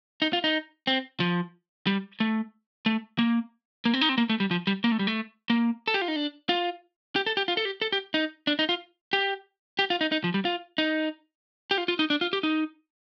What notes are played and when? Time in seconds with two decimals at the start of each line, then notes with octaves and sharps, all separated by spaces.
0.22 D#4
0.33 F4
0.44 D#4
0.87 C4
1.20 F3
1.87 G3
2.20 A3
2.86 A3
3.19 A#3
3.85 A#3
3.94 C4
4.01 D#4
4.09 C4
4.18 A#3
4.29 A3
4.40 G3
4.51 F3
4.67 G3
4.84 A#3
4.92 A3
4.99 G3
5.07 A3
5.50 A#3
5.88 A4
5.94 G4
6.01 F4
6.08 D#4
6.16 D4
6.49 F4
7.16 G4
7.26 A4
7.37 G4
7.48 F4
7.57 A4
7.65 G4
7.82 A4
7.92 G4
8.14 D#4
8.47 D4
8.59 D#4
8.69 F4
9.13 G4
9.79 G4
9.90 F4
10.01 D#4
10.12 D#4
10.24 F3
10.34 G3
10.45 F4
10.78 D#4
11.71 G4
11.78 F4
11.88 F4
11.99 D#4
12.10 D4
12.21 F4
12.33 G4
12.43 D#4